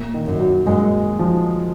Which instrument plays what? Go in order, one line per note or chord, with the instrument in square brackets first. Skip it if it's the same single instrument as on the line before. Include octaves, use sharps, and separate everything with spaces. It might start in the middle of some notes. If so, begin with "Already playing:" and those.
Already playing: [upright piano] A#2
D#3
[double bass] F#2
[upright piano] F#3
[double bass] F#2 [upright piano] G#3
[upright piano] F3